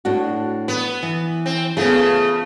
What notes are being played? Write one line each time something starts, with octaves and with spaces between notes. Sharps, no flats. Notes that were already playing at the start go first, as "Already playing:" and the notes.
A2 D4 F#4
B3 B4
E3
C4
C#3 A3 B3 F4 G#4